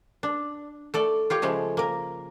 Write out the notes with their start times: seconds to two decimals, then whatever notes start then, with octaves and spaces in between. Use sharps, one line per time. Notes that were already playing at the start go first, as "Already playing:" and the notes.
0.23 D4
0.94 A3 A4 D5
1.30 F4 G4 C#5
1.42 C#3 F3 G#3 A3
1.77 A#3 A#4